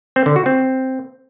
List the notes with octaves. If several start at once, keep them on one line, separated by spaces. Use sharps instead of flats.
C4
D3
F#4
C4